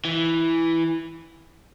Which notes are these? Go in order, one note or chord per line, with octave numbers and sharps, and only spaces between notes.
E3